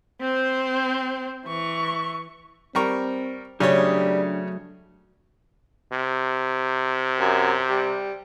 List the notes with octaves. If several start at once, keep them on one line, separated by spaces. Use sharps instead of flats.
C4 C5
E3 C#6
G3 C4 A#4 C#6
C#3 F#3 G3 A3 D4 G#4 C#5
C3
F#2
G3